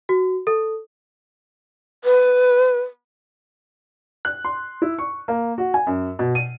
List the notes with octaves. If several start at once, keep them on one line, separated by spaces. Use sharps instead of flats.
F#4
A4
B4
F#6
C6
E4
C#6
A#3
F#4
G#5
F#2
B2
D#7